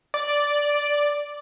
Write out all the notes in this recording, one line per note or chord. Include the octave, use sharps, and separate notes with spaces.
D5